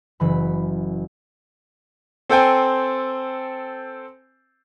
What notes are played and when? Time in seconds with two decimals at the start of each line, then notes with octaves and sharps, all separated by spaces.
0.20 F#1 E3 B5
2.30 C4 A4 C5 G5 G#5